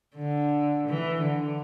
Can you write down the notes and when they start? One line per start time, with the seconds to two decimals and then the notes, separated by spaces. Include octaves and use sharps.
0.16 D3
0.88 E3
1.24 D3